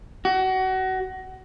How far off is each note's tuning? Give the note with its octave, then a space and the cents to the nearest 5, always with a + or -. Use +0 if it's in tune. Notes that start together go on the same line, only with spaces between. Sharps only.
F#4 +25